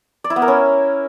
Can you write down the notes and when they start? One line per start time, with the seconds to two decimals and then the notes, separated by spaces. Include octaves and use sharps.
0.24 D5
0.30 E4
0.36 B3
0.42 A#4
0.48 C#4